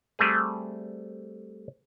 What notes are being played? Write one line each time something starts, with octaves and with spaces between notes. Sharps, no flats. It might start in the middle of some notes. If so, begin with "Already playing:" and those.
G3 A3 C4 G#4